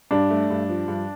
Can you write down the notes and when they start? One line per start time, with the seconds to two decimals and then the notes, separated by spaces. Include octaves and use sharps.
0.11 G2 D4
0.30 A3
0.50 G2
0.69 F3
0.88 G2